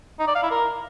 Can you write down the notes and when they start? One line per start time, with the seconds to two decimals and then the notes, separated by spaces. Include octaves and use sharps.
0.20 D#4
0.27 D5
0.35 F5
0.43 E4
0.51 A#4